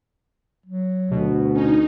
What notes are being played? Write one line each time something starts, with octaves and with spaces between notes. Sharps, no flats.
F#3
D2 B2
C#4 D#4